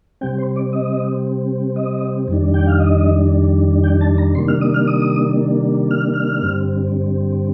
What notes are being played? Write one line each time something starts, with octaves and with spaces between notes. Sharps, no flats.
C3 G3 C4 G5
C5
D5
D#5
D#5
F2 D#3 G3 D4
G5
F5
D#5
G5
A5
A#5
C3 D#3 G3 A#3 D4 C6
F6
D#6
F6
D#6
F6
F6
G2 D3 G3 C4